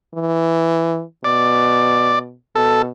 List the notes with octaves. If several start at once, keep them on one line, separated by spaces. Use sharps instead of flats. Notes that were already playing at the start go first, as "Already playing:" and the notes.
E3
B2 D5
B2 A4